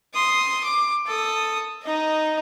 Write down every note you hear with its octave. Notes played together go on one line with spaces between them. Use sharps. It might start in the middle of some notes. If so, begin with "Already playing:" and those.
C6 D#6
D6
A4 D#6
D#4 D#5